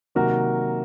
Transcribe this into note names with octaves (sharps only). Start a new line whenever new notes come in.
C3 D#3 F#3 A#3 F#4 A#4